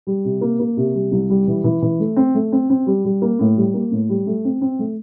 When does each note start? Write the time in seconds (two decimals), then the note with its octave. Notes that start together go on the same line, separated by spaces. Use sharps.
0.07 G3
0.24 C3
0.41 A#3
0.60 A#3
0.77 C3
0.95 G3
1.12 C2
1.30 G3
1.47 E3
1.64 E3
1.82 E3
2.00 A3
2.16 C4
2.34 A3
2.52 C4
2.70 C4
2.87 G3
3.05 G3
3.22 A#3
3.39 A2
3.57 G3
3.74 A#3
3.91 A2
4.09 G3
4.26 A3
4.45 C4
4.61 C4
4.79 A3